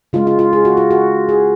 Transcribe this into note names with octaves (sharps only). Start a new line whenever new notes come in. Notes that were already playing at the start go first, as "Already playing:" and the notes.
C#3 G#3 F4
F4
F4
G#4
F#4
F4
F#4
G#4